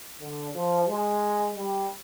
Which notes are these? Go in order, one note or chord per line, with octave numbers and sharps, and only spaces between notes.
D3
F3
G#3
G3